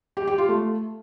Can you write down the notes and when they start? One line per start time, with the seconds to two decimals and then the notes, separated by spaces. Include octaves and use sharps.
0.17 G4
0.27 G4
0.38 F4
0.49 A3